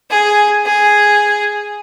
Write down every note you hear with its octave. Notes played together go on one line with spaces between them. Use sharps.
G#4
G#4